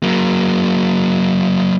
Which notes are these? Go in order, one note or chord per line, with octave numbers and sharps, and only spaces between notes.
F#3 A#3